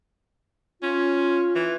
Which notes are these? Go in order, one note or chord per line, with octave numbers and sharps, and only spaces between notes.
C#4 F4
E3